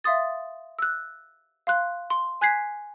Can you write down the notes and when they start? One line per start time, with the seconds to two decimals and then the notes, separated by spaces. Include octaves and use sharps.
0.04 E5 F5 C6 D#6 A6
0.79 E6 F#6
1.67 F5 C6 F#6
2.10 C6
2.41 G#5 F#6 G#6 B6 C7